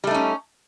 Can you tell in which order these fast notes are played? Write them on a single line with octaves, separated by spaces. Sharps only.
G3 A3 D#4 C#4